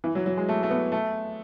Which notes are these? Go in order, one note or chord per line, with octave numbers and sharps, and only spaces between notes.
E3
F#3
F#3
G#3
A3
A3
B3
A3